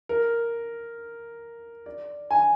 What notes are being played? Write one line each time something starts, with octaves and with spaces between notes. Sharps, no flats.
A#4
D5
G#5